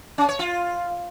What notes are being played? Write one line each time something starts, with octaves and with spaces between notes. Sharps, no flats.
C#4
C#5
F4